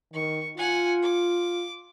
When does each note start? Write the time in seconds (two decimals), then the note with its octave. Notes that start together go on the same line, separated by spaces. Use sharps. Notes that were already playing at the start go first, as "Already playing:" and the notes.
0.13 D#3 C#6
0.57 F4 F#5 G#5
1.03 D6